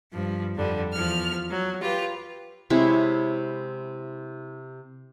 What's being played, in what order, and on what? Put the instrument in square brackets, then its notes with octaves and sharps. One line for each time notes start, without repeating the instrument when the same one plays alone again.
[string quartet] G2 F3
F2 D3 G3
E2 F3 F6
F#3
F4 G4 B4
[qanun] C3 G#3 E4 C#5